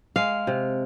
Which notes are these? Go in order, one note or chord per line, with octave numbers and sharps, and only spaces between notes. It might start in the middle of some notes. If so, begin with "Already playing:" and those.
G#3 F5
C3